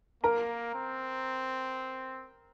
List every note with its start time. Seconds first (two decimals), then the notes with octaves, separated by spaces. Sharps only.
0.24 A#3 A#4 A#5
0.74 C4